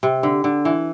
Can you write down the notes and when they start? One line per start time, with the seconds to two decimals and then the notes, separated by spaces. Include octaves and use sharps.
0.03 C3
0.23 D3
0.44 D3
0.65 E3